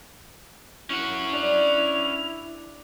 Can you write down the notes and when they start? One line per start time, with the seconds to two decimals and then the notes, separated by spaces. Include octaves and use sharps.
0.90 C#4 E4 F#5
1.33 D4 E5 F7